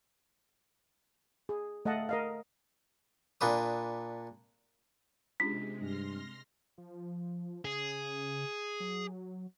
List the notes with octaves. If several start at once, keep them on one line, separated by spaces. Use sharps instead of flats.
G#4
A3 D#5 F5 F#5 A5
A#4 D#5 F5
A#2 D4 B4 D#6
C3 G#3 C#4 D4 F4 B6
G2 C6 F6 A#6
F3
C#3 G#4
F#3